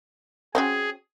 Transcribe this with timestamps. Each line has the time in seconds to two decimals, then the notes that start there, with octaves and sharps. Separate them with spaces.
0.55 C4 C#4 F#4 G#4